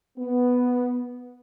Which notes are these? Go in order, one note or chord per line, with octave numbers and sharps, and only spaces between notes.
B3